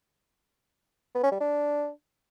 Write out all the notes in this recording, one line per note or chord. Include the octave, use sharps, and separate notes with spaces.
B3
C#4
G3
D4